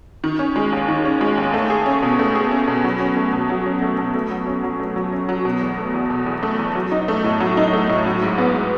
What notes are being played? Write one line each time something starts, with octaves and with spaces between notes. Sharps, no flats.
D#3
C#4
G#3
D#2
D#3
C#4
G#3
D#2
A3
G#4
C#4
B2
A3
G#4
C#4
B2
F#3
C#4
A3
B2
F#3
C#4
A3
B2
A3
F#3
C#4
F#3
A3
F#3
C#4
F#3
B2
E2
A3
E2
B2
E2
A3
E2
F#3
D#4
A3
A2
F#3
D#4
A3
A2
F#3
G#2
B3